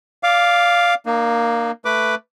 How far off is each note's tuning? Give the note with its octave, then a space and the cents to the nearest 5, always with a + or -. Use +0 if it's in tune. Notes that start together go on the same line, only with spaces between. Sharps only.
D5 -20 F5 +0 D6 +5
A#3 +0 D#4 -45
A3 +10 B4 +0 D6 +0